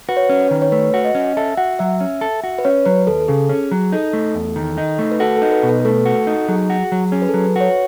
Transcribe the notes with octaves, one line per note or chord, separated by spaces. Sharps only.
F#4 B4
C#5
B4
C#4
B4
D#3
C#5
A3 B4
F#4
D#5
C#4
A4 E5
F#4 F#5
F#3 E5
C#4
A4
F#4
B4
C#4 C#5
F#3 B4
D#2 A4
A4
C#3 G#4
C#4
F#3
D#4 A4
A3
E2
D#3
D#4
A3
B4
F#4 A4
A4
D#4
B4
B2
B4
B4
A3 A4
F#4
D#4
F#3 G#4
F#4
F#3
C#4 G#4
B4
F#3 A4
B4
F#4 C#5